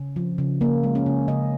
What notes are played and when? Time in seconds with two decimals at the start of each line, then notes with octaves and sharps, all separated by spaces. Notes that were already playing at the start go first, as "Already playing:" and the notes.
Already playing: C#3 C#4
0.16 F3
0.38 C#3
0.61 C#3 A#3
0.83 G#3
0.95 C#4
1.06 C#3
1.28 C#3 D#5